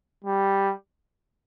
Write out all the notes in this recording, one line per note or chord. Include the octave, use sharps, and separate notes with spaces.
G3